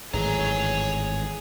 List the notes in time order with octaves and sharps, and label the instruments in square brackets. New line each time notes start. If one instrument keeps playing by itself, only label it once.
[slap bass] G#1 A2 E3 [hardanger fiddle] G#4 [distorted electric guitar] C#5 A#5